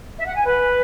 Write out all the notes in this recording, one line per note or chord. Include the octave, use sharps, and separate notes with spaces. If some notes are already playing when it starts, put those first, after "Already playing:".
E5
F#5
G#5
B4